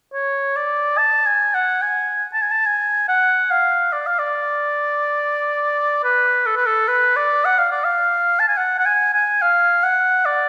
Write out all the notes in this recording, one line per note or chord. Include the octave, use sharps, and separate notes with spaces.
C#5
D5
A5
G#5
F#5
G#5
A5
G#5
A5
G#5
F#5
F5
D5
F5
D5
B4
A4
B4
A4
B4
D5
F#5
F5
D5
F5
A5
G#5
F#5
F#5
G#5
G#5
F5
F#5
D5